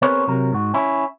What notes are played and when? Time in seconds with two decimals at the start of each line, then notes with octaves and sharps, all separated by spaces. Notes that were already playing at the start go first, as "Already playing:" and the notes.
0.02 B3 C4 G#4 A#4 B4 C#5
0.28 C3 F#3 A#4
0.52 G#2 F#4
0.74 C#4 E4